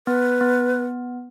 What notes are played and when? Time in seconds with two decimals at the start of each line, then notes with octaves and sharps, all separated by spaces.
0.07 B3 B4
0.41 B3